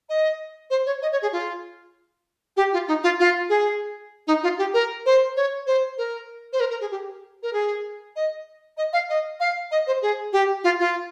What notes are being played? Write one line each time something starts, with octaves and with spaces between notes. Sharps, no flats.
D#5
C5
C#5
D#5
C#5
G#4
F4
G4
F4
D#4
F4
F4
G#4
D#4
F4
G4
A#4
C5
C#5
C5
A#4
C5
A#4
A#4
G#4
G4
A#4
G#4
D#5
D#5
F5
D#5
F5
D#5
C5
G#4
G4
F4
F4